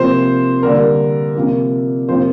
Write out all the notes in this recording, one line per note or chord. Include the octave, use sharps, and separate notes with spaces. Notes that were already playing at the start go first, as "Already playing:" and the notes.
Already playing: C3 F3 A#3 C5
D3 G3 A#3 A#4
C3 F3 A#3
C3 F3 A#3 C5